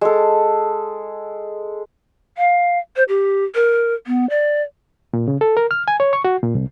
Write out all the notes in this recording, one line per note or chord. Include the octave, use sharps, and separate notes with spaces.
G#3 A4
F5
C5
G4
A#4
B3
D5
A#2
C#3
A4
A#4
F6
G#5
C#5
C#6
F#4
A#2
C2